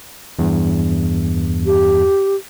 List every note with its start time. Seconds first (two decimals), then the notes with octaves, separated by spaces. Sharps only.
0.39 E2 G2
1.66 G4